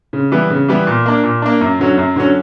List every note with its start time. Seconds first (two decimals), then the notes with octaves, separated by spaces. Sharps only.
0.13 C#3
0.32 E3 G3 B3
0.50 C#3
0.68 E3 G3 B3
0.87 A#2
1.06 A#3 D4
1.24 A#2
1.42 A#3 D4
1.61 F#2
1.79 D3 F#3 C#4
1.98 F#2
2.16 D3 F#3 C#4